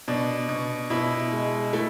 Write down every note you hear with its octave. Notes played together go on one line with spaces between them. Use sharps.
B2 D4
B2
B2 E4
G#3
A3 E4